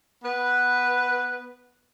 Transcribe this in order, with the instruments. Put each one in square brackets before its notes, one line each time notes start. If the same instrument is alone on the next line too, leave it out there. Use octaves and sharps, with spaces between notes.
[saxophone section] B3 B4